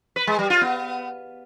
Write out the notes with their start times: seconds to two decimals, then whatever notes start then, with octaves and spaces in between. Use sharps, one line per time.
0.16 B4
0.27 G#3
0.39 G3
0.50 F4
0.61 B3